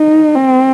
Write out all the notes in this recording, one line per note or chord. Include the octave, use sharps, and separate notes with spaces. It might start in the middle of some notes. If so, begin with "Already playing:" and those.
Already playing: D#4
C4